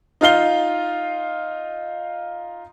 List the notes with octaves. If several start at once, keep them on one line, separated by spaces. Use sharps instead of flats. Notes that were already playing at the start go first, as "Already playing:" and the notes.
D#4 F4 F5 G7